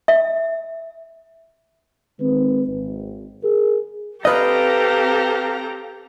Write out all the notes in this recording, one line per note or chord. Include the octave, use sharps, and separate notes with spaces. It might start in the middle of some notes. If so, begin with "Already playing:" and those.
E5
D#3 G#3 C4 B4
G#1
G#4 A#4
C4 G4 A4 B4 D#5 F5 A#5